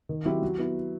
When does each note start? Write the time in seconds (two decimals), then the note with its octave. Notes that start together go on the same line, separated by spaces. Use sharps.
0.09 D#3
0.25 F#3 C4 E4 G4
0.42 F#3
0.58 B3 E4